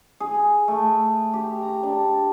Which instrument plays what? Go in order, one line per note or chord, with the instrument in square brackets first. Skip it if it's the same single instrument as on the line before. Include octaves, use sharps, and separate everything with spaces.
[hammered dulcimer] G#4
A3
G4
A#5
D4